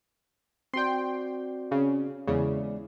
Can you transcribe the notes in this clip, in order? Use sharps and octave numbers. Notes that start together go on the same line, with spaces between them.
C4 F#4 D5 G5 C6
C#3
E2 C#3 G#3 E4 D5